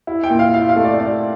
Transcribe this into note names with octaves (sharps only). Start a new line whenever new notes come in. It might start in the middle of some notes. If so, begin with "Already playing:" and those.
E4
G5
A#2
F5
E4 F5
F5
A3
D5
A3 D5